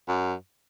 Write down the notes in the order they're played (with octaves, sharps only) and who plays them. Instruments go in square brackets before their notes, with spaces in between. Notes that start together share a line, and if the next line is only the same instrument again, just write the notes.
[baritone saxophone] F#2